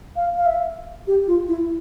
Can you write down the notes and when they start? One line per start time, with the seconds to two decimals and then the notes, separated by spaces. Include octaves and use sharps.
0.16 F5
0.37 F5
0.46 E5
1.07 G4
1.27 F4
1.48 E4